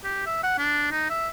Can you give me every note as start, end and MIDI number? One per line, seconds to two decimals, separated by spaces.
0.04 0.22 67
0.26 0.40 76
0.43 0.57 78
0.58 0.88 62
0.91 1.07 63
1.10 1.28 76